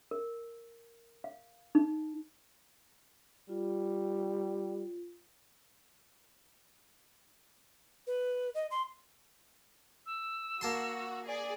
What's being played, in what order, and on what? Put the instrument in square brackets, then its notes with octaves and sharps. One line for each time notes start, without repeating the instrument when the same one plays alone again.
[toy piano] A#4
F5
D#4
[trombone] G3 [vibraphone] F4
[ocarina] B4
D#5
C6
[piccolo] E6
[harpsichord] A#3 A5 C6 [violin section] F#4
[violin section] G#4 D5